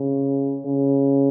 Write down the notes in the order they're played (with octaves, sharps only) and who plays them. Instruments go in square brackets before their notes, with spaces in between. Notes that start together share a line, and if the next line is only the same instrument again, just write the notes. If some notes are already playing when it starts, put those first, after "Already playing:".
Already playing: [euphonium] C#3
C#3